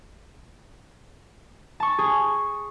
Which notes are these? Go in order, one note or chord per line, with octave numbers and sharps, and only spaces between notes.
A5 C#6
G#4